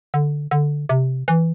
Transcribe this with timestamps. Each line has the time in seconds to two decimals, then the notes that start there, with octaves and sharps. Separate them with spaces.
0.14 D3
0.51 D3
0.89 C3
1.28 E3